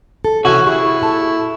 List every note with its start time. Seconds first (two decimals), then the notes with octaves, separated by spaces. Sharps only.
0.25 A4
0.45 C3 E3 C#4 F#4 E5 G#5
0.66 E4 G4 G#4 C#6
1.01 A#2 A4 A5